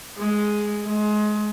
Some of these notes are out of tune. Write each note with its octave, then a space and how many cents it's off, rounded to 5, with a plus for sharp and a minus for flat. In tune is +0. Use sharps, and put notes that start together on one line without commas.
G#3 +5
G#3 +25